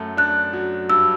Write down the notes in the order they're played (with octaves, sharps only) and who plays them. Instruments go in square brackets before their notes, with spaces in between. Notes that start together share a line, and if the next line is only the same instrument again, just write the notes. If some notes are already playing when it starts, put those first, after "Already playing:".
Already playing: [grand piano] F#2 A3
[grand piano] D4 [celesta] F#6
[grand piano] F#3
[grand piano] G2 [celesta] E6